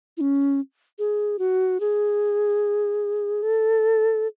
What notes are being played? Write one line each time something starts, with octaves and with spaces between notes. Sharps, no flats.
E4
C#4
G#4
F#4
G#4
A4